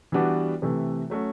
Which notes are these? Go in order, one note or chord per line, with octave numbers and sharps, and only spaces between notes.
E3 G3 B3 D4 F#4
C3 E3 A3
F#3 A3 C#4 F#4